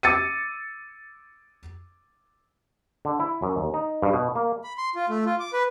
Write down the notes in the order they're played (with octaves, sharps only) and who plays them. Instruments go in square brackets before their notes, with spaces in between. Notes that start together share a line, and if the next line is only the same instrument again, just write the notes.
[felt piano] D6 E6 A6 C#7 D#7
[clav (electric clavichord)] D3
E4
F#2
D#2
D#4
G2
B2
A#3
[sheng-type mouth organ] B5
C6
F4
A3
F4
D6
B4